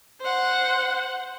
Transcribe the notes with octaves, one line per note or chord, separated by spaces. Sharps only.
C5 F#5